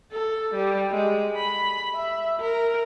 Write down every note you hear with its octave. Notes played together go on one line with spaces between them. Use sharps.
A4
G3
G#3
B5
E5
A#4